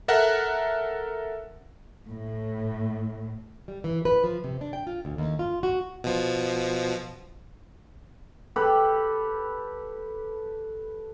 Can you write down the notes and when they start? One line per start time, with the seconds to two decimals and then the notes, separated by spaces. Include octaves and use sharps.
0.08 A4 A#4 E5 F#5 F#6
2.07 A2
3.68 G3
3.84 E3
4.05 B4
4.24 F3
4.44 C3
4.61 D4
4.73 G5
4.87 F4
5.05 D2
5.18 D#2
5.39 F4
5.63 F#4
6.04 B2 F3
8.56 G4 A4 B4